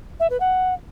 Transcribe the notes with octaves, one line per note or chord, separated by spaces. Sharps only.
E5
B4
F#5